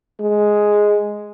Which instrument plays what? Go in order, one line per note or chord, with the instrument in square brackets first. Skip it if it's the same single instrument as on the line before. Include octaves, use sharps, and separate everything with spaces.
[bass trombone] G#3